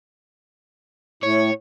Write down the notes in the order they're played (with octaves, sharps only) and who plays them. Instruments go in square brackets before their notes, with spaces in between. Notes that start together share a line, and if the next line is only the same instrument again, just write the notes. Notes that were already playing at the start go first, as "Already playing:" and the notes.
[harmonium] A2 [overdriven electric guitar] C#5